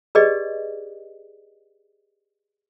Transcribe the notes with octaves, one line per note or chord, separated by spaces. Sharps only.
G4 G#4 B4 D5 D#5